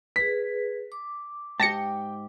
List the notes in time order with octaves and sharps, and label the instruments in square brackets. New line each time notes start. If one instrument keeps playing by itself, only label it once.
[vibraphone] G#4 B4 [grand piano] B6
[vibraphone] D6
[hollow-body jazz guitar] G#2 G4 [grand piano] G5 [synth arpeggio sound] A5 A#6 C#7